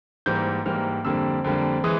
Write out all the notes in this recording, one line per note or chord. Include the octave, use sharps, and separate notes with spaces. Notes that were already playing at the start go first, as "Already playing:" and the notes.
G#2 E3 G3 A#3 G6
G#2 E3 G3 A#3 F6
F2 D3 G3 A#3 E6
F2 D3 G3 A#3
E3 G#3 D#6